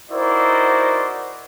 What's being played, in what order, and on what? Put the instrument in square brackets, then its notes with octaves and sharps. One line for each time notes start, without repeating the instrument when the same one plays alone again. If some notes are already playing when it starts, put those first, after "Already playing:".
[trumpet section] D#4 E4 F#4 A#4 C5 D5